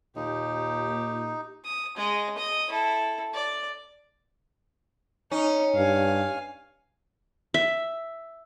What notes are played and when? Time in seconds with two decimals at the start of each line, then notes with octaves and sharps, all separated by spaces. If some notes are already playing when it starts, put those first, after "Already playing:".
0.16 D#2 A#2 D#4 G4
1.65 D#6
1.96 G#3 D#5
2.37 D#5 D#6
2.70 E4 A4
3.34 D5
5.31 C#4 D#4
5.75 G2 F5 G#5
7.54 E5